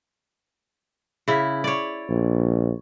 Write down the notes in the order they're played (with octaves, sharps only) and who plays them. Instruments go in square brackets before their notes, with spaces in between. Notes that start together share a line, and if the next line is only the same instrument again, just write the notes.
[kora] C#3 E4
C#5 D5
[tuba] A#1